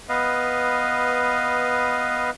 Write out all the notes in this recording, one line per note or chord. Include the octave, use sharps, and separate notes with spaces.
B3 B4 D#5 F5